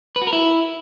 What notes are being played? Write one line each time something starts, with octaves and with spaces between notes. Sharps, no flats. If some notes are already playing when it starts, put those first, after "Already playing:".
B4
F#4
A#4
E4